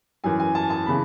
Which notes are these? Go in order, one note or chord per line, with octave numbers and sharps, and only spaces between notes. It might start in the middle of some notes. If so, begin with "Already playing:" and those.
F#2 E3 G#5
G#5
A5
A5
C#3 E3 B5